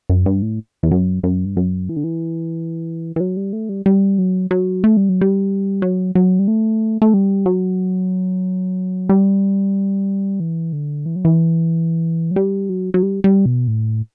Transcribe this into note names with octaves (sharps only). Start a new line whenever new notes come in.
F#2
G2
A2
E2
F#2
F#2
G2
F#2
E3
D3
E3
E3
F#3
G3
A3
G3
G3
F#3
F#3
A3
G3
F#3
G3
F#3
F#3
G3
A3
A3
G3
F#3
G3
E3
D3
E3
F#3
E3
F#3
G3
F#3
F#3
G3
G3
B2
A2